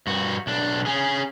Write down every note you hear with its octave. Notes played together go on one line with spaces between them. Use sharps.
G2 F#4
B1 D4
C#4 G#4